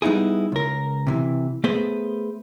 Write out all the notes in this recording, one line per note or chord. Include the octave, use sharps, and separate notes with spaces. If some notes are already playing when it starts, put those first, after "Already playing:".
G3 B3 D#4 E4 G#4
C#2 A#4
C3 D#3 E3
A3 B3 G#4 B4 C5